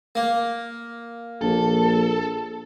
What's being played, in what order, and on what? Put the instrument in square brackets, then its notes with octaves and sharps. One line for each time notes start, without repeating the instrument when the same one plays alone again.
[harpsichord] A#3
[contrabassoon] A#1 [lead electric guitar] A4